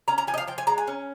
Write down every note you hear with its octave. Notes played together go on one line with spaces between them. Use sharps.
C#4 A#5
A#5
F3 G#5
D#5
F5
F3 G5
G#5
G#3 A#5
G#5
C#4